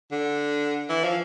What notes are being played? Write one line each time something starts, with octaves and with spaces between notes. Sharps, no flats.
D3
E3
F3